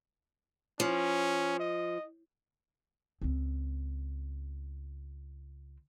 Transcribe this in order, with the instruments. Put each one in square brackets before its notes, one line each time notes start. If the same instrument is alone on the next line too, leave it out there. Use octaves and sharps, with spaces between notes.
[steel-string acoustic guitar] F3 [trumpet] C#4
[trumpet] D#5
[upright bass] C#2 C4